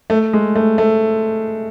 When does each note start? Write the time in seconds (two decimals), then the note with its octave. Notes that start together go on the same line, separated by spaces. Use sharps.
0.10 A3
0.33 G#3
0.56 A3
0.78 A3